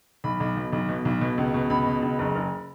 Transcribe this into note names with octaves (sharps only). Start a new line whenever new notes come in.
B1 B5
B1
B2
B1
B2
B1
B2
C#2
B2
C#2 B5
B2
C#2
F#1
F#1